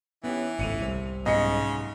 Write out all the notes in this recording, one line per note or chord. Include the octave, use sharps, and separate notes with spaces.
E3 B3 C#4 G4
G#1 C#2 A2 C#7 D#7 F7
C2 C3
B1 G#2 C#3 D#5 C#7